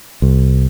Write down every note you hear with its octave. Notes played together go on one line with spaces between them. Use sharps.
C2